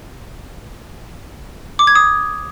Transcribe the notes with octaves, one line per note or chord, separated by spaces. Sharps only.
D6
G#6
D#6